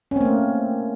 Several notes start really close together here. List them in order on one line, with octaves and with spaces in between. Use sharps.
C#4 C4 A#3 A3